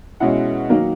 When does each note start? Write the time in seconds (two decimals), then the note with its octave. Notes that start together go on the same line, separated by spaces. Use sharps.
0.20 B2 G#3 C#4 E4 F#5
0.70 D#3 F#3 A#3